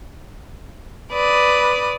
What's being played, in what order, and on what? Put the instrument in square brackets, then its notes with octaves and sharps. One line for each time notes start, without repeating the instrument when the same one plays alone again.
[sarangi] B4 [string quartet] D5 D#6